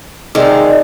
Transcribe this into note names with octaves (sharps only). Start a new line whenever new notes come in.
C3 D#3 G#3 D#4 D5